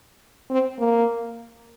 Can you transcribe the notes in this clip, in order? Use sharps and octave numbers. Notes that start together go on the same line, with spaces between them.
C4
A#3